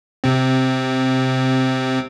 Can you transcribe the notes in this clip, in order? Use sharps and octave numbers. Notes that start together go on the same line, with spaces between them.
C3 C4